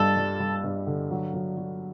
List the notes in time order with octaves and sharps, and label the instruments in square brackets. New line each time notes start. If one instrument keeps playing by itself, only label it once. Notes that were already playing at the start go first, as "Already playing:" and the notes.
Already playing: [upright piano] G2 G3 [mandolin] A4
[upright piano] G3
G3
G2
D3
F#3
F#3
F#3